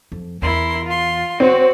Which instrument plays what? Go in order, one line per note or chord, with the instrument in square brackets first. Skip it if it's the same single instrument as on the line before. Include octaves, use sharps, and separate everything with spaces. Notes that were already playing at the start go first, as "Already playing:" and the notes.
[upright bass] F2
[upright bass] E2 [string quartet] E4 A#4 C6
[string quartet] F4 C6
[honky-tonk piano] C4 [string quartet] F#4 C#5